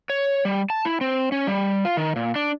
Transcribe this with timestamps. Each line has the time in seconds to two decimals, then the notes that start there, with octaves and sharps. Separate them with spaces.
0.10 C#5
0.45 G3
0.70 A5
0.85 E4
1.01 C4
1.32 C#4
1.47 G3
1.85 F4
1.97 D#3
2.16 A#2
2.36 D4